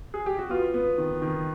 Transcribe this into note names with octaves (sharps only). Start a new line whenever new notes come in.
G#4
G4
F#4
B3 F4
B3
D#3
D#3